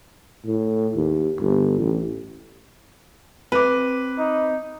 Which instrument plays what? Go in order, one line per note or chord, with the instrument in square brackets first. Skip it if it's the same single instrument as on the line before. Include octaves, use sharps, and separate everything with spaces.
[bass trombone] A2
D#2
G1
A1
[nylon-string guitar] C4 [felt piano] B4 D6
[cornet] D#4